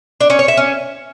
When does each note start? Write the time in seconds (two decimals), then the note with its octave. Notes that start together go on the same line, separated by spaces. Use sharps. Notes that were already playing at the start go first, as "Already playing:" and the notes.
0.21 D4
0.30 C#4
0.39 C#5
0.48 E5
0.57 C#4